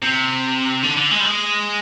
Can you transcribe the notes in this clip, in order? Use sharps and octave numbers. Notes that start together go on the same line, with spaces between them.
C3
D3
D3
G#3
G3
G#3